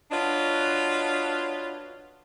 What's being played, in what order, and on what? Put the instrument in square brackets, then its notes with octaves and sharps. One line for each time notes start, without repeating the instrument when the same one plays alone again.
[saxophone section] D4 F4 F#4 B4 C#5 D#5